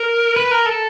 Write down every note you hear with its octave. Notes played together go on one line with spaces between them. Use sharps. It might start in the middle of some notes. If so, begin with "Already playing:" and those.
Already playing: A#4
B4
A#4
A4